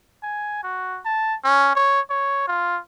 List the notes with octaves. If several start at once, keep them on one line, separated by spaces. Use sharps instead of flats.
G#5
F#4
A5
C#4
C#5
C#5
F4